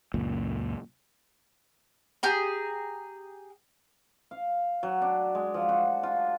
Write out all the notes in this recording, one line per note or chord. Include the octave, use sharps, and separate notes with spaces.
C#2 F#2 A#2
G4 G#4 A#5
F5
F#3
D4
G#3
F3
F#4
F4